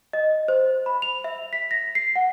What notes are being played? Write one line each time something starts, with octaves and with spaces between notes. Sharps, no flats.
D#5
C5
B5
F7
E5
B6
A#6
C7
F#5